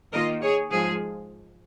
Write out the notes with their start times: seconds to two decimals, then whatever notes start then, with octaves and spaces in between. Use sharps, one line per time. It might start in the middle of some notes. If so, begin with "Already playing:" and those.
0.13 D#3 A#3 F4 A#4 D#5
0.42 G#4 C#5
0.71 G#2 F3 G#3 G#4